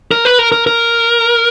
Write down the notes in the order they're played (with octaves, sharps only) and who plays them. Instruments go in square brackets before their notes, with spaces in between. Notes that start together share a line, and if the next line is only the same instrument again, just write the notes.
[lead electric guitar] A#4
B4
A#4
A#4
A#4